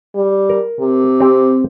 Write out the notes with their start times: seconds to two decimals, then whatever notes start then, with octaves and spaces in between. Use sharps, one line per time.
0.15 G3
0.50 A#4
0.80 C3
1.20 C4 G4